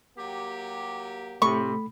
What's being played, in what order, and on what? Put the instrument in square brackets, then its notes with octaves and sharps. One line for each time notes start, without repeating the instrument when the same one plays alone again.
[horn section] F#3 A#3 G4
[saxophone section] A2 C3 [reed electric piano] A3 B5 [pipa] C#6